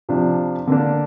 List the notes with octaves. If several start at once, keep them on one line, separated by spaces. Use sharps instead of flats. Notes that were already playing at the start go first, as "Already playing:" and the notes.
C3 F3 D4
D3 A#3 D4